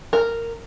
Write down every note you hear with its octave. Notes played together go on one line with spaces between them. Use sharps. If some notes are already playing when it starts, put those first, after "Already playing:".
A#4